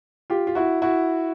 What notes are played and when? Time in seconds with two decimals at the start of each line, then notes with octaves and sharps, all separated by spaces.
0.30 F4 G4
0.47 F4
0.55 E4 F#4
0.82 E4 F#4